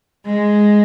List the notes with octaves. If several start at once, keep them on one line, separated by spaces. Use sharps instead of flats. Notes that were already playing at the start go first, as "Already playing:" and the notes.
G#3